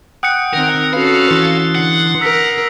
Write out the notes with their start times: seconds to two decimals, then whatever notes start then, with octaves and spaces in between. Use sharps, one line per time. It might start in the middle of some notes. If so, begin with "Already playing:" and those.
0.23 F#5 G5 D#6 F#6 C#7
0.53 D#3 C4 A#4
0.93 C#4 F#4 A4 B4 F5
1.31 E3 C6 A6
1.75 D3 F#5 C7
2.21 A#4 E6 B6